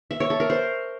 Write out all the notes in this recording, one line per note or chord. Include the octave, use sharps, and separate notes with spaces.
E5
C#5
A4
A#4
C5